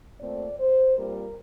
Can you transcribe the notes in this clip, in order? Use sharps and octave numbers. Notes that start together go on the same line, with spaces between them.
A#2 A3 C4 D5
C5
A#2 G3 C4 A#4